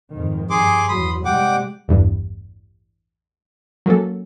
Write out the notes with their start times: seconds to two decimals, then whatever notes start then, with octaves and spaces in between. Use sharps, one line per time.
0.13 F2 G#2 D#3
0.50 G2 G#4 C6 D6
0.88 E2 F#3 B5 C6 D#6
1.25 C3 G3 G#3 F#5 G5 D6
1.88 A1 E2 G2
3.86 F#3 A#3 C#4 A4